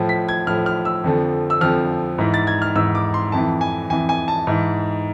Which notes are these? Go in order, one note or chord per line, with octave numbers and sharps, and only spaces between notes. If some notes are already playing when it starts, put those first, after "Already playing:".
Already playing: A2 F3
B6
G#6
A2 F3 F6
F6
E6
F2 D3 F3
E6
F2 D3 F3 F6
G#2 E3
A6
G#6
F6
G#2 E3 E6
D6
C6
F2 E3 A5
G#5
F2 E3 G#5
G#5
A5
G#2 E3